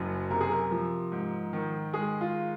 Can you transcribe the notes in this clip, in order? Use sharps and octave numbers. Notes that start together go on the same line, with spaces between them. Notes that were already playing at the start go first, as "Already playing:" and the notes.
Already playing: F#1 F#2
C3 A#4
G#4
A#4
F3
G#2
D#3
G#3 G#4
F4